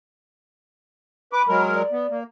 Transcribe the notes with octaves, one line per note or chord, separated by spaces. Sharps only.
B4 B5 D6
F#3 G#3 A#4
D5
B3
A#3